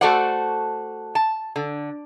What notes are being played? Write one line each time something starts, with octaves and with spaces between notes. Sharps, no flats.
A3 F#4 A4 C5 D5 F#5
A5
D3